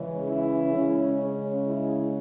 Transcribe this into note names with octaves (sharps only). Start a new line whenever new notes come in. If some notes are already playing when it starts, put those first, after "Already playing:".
Already playing: C#3 E3 G#3 C#4
E4
C#3 G#3 C#4
C#4
E4